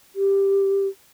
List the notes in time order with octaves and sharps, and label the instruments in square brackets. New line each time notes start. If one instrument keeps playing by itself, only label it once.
[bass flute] G4